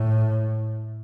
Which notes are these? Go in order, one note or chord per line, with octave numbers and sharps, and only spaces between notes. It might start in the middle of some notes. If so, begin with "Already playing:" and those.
Already playing: A2